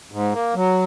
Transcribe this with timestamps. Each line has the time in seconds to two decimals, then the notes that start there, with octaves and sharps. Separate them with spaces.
0.12 G#2
0.33 A#3
0.55 F#3